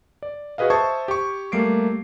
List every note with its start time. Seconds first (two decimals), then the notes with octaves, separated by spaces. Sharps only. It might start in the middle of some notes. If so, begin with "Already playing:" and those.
0.23 D5
0.58 F#4 G#4 B4 D#5 F5
0.70 C5 E5 A5 C#6 D#6 G#6
1.08 G4 C#6
1.52 G3 A3 A#3 C7 D7